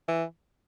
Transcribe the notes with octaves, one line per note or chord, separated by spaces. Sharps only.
E3